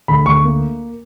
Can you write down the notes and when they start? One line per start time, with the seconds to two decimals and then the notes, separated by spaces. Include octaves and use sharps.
0.08 D2 B5
0.26 D2 C#6
0.44 A#3